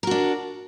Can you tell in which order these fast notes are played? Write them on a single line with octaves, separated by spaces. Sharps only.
A#4 F#4 D4